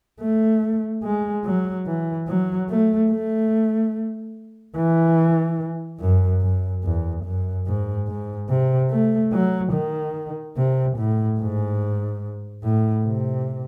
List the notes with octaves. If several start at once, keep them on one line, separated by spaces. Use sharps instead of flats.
A3
G#3
F#3
E3
F#3
A3
A3
E3
F#2
F#2
E2
F#2
G#2
G#2
C3
A3
F#3
D#3
C3
A2
G#2
A2
C3